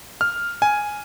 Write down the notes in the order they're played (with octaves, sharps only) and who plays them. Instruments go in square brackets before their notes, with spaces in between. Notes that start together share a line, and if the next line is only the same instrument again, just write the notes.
[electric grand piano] F6
G#5